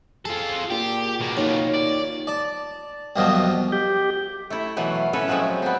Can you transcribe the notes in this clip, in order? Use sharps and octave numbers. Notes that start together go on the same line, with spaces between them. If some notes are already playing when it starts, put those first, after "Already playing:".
F4 G#4 A4
A#2 G4
B2 A#3
D#2 F4 C#5
D5
D5 A5
C2 F2 B2 D#3 F3 F#3
G4
A3 E4
B2 E3 F#3 A3
F5
C#4 E4 A4 B4 C#5
F3 F#3 G#3 A3 C4
B3 C4